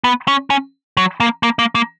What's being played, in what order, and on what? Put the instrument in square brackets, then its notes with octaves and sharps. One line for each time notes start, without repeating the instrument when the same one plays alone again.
[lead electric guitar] B3
C#4
C#4
F#3
A#3
A#3
A#3
A#3